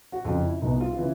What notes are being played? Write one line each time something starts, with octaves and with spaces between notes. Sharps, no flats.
F#4
F2 C#3 F3 F4
E4
C2 B2 D#4
F4
F4
C#3 E3 E4